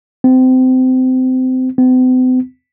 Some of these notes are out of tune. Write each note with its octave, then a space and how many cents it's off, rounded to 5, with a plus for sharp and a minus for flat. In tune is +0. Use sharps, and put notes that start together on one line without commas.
C4 -25
C4 -45